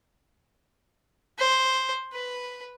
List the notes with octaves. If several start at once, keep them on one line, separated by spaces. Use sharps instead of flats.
C5
B4